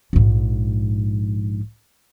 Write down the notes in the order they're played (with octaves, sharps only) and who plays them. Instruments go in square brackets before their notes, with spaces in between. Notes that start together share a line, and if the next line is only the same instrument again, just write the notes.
[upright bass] A#1 G#2